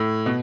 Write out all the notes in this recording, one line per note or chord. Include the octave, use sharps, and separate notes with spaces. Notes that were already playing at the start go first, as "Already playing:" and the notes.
Already playing: A2
B2